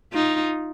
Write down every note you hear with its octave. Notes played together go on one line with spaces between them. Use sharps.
D#4 F4